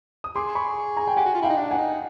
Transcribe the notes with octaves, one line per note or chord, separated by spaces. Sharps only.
D#6
G#4 C6 D6
B5 C#6
G#5 A#5
G5
G4 F#5 G#5
F#4
F4
E4 F5 G5
D#4
D4
F#5 G#5
D#4